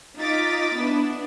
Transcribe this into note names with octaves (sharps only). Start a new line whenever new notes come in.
D#4 F4 D6 A6 B6
B3 D4 E4